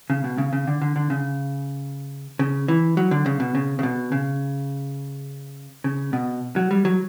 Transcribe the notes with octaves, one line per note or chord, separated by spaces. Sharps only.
C#3
B2
C#3
C#3
D3
D3
D3
C#3
C#3
E3
F#3
D3
C#3
B2
C#3
C#3
B2
C#3
C#3
B2
F#3
G3
F#3